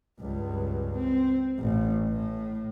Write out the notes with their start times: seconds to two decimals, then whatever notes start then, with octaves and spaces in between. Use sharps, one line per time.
0.19 C#2 G2
0.95 C4
1.58 A1
2.09 A2